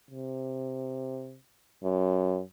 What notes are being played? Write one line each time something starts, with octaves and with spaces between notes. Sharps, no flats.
C3
F#2